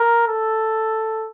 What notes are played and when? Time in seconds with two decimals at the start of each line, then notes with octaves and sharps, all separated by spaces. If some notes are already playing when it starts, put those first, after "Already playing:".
Already playing: A#4
0.28 A4